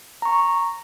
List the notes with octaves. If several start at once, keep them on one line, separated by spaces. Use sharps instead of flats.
A#5 C#6